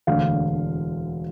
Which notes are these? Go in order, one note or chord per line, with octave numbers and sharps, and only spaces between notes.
E1 D2 D3 F5